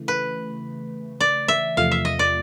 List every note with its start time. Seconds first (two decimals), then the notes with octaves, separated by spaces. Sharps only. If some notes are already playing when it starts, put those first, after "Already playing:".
Already playing: C#3 E3 A3
0.08 B4
1.20 D5
1.48 E5
1.77 E2 C3 F3 A3 F5
1.91 E5
2.05 D#5
2.19 D5